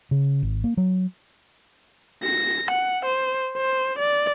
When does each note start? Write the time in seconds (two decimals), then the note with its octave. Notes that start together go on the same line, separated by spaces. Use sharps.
0.11 C#3
0.43 G#1
0.64 A#3
0.77 F#3
2.23 A#6
2.71 F#5
3.05 C5
3.57 C5
3.99 D5